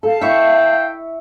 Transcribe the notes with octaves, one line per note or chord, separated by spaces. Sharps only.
A4 F5 A5
E4 E5 G5 C#6